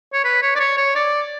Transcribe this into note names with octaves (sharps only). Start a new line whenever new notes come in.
C#5
B4
C#5
D5
C#5
C#5
D5